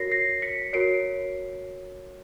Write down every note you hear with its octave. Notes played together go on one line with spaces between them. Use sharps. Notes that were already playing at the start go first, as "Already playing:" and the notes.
Already playing: F#4 A#4 C#5 A#6 C7
A#6 C7
B6 C#7
F#4 A#4 C#5 C7 D7